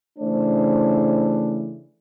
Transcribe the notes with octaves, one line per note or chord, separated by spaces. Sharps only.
C#3 E3 A3 D4 C5